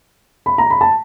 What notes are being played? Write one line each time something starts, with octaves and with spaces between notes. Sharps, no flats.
B5
A#5
B5
A5